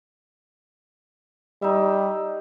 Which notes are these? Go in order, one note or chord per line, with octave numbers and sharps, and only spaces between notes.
G3 D#4 E5